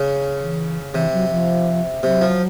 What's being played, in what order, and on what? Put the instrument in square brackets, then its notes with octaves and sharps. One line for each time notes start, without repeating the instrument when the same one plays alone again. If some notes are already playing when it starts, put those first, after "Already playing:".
Already playing: [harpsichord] C#3
[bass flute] E3
[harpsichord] C3 [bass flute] E3
[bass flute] F#3
F3
[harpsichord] C3 [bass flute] F#3
[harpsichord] F3